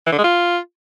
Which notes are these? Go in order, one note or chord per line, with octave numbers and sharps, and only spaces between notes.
E3
D3
G#3
F4